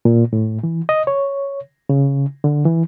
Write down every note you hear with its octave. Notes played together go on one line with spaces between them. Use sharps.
A#2
A2
E3
D#5
C#5
C#3
D3
E3